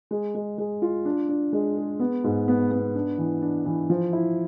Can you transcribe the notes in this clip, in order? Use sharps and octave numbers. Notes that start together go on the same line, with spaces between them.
G#3
G#3
G#3
F4
D4
D4
G#3
G#4
B3
G#2
B3
B3
D4
E3
D4
E3
F3
E4